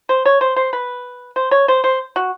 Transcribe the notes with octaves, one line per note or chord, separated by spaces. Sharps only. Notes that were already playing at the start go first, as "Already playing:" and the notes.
C5
C#5
C5
C5
B4
C5
C#5
C5
C5
F#4